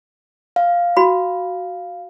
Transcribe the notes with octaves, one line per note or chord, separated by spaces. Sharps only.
F5
F#4 B5